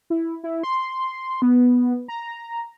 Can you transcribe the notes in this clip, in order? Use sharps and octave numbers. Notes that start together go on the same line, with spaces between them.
E4
E4
C6
B3
A#5